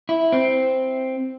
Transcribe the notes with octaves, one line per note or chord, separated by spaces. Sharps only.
E4
C4